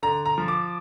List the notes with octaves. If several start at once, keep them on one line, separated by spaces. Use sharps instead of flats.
D3 A#5
A#5
F3
D6